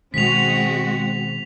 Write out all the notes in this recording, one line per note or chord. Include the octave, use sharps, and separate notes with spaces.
B2 D#3 G#3 C4 F#4 B6 F7